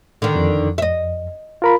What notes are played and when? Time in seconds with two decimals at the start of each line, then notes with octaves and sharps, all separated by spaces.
0.22 D3 D#3
0.36 F2
0.78 D#5 E5
1.62 F4 A#4 B5